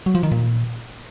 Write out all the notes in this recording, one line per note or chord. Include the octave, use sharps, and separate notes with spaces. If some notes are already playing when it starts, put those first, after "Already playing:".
F#3
F3
D#3
A#2